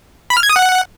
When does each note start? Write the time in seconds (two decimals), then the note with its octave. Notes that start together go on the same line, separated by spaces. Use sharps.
0.30 B5
0.37 F6
0.43 G#6
0.49 D#6
0.56 F#5